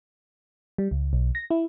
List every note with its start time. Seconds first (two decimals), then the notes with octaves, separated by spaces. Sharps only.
0.78 G3
0.91 C#2
1.13 B1
1.35 A#6
1.51 E4